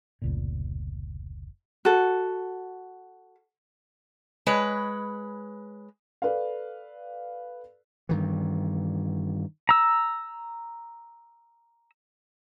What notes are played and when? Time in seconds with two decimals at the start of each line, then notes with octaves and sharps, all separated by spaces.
0.22 F1 C#2 A#2
1.85 F#4 A4
4.46 G#3 B4 C#5
6.22 A4 B4 D5 F5
8.09 G2 D#3 E3
9.69 A#5 E6